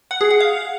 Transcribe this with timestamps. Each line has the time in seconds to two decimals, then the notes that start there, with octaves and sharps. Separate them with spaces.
0.11 F#5
0.21 G#4
0.31 F#5
0.40 F5